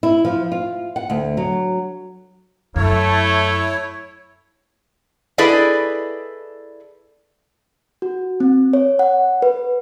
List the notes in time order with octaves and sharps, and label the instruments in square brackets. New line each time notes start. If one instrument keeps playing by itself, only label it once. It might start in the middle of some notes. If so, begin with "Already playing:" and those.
[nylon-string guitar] E4
F3
F4
F#5
D2
F#3
[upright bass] F#2 [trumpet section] A3 [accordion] E4 C#5
[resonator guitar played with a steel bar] E4 G#4 A4 B4 D5 D#5
[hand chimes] F#4
C4
C#5
F#5
B4